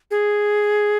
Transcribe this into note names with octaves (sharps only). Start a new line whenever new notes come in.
G#4